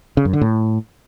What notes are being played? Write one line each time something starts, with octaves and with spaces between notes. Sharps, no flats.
C#3
F#2
D3
A2